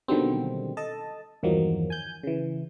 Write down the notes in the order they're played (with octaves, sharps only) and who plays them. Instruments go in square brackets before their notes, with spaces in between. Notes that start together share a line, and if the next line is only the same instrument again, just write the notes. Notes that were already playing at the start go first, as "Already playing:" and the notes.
[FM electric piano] B2 D3 D#3 F#3 G3 C4
A4 D#5 A5
E2 G2 D#3 F3 F#3 A#3
G#5 G6
C#3 E3